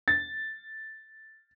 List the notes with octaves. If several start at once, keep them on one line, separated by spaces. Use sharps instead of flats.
A6